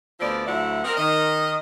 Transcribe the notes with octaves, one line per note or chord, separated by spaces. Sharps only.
D2 F3 B3 C4 D5
D2 F3 F#3 E4 E5 F#5
C4 A#4 D#5
D#3 D#5